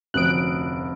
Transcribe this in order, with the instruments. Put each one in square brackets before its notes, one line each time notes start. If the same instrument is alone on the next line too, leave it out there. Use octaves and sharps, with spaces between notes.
[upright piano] F1 D2 D#6 [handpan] F3 C4 C#4 [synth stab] F#6 D7